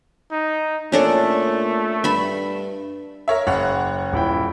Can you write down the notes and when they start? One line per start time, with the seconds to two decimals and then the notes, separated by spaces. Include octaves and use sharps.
0.32 D#4
0.92 A#2 A3 C#4 D4 A4
2.04 G2 E5 B5
3.28 A#4 C#5 E5
3.47 F#1 C#5 F#5
4.13 D#1 E4 G5